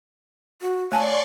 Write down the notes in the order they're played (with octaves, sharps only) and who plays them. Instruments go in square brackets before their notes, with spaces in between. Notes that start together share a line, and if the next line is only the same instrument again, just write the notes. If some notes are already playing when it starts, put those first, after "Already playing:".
[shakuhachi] F#4
[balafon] A3 G#5 A5 [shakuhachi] C#5 [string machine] D5 C6 C#6